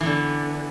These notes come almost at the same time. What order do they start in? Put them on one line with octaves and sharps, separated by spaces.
E3 B3 D3